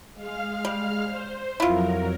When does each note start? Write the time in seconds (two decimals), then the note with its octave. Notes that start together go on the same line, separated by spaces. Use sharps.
0.13 G#3 F5 F6
0.65 G3
1.05 C5
1.60 F2 F#3 E4 F4 A#4